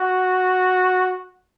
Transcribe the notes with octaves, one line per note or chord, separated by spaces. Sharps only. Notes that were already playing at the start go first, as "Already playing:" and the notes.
Already playing: F#4